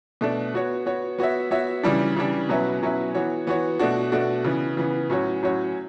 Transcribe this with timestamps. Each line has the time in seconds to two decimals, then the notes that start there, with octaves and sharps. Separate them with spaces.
0.21 B2 A3 D4
0.54 B3 F#4 C#5
0.86 B3 F#4 C#5
1.18 B3 F#4 C#5 E5
1.51 B3 F#4 C#5 E5
1.83 C#3 E3 G3 D4
2.16 C#3 E3 G3 D4
2.49 B2 F#3 C#4 E4 B4
2.82 B2 F#3 C#4 E4 B4
3.15 E3 B3 F#4 C#5
3.47 E3 B3 F#4 C#5
3.79 B2 A3 D4 F#4
4.12 B2 A3 D4 F#4
4.44 C#3 E3 B3
4.77 C#3 E3 B3
5.10 A2 F#3 C#4 F#4 C#5
5.42 A2 F#3 C#4 F#4 C#5